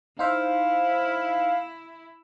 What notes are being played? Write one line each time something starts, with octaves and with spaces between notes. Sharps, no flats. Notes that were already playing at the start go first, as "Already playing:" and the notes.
D#4 E4 C5 E5 F5